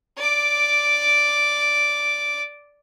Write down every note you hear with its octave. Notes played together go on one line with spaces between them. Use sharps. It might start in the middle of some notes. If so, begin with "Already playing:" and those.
D5 D6